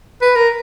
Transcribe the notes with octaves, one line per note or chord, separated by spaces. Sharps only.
B4
A#4